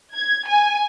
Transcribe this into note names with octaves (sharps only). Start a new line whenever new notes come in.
G#6
G#5